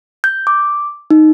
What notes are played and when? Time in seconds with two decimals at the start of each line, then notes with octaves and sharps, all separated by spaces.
0.24 G6
0.47 D6
1.10 D#4